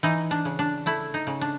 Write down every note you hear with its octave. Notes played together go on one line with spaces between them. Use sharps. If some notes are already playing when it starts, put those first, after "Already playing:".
E3 D#4
D4
C#3
D4
A3 E4
D#4
C#3
D4